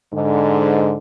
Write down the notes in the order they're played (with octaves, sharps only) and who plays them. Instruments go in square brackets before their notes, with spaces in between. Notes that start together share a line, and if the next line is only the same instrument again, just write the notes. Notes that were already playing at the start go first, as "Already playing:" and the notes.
[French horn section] G#2 D3